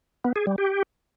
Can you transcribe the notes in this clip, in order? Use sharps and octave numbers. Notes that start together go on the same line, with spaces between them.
B3
G#4
G3
G4